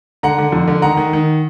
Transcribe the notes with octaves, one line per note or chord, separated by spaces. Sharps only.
D3 F#5 A#5
D3
F2
D3
D#3 F#5 A#5
D#3
D#3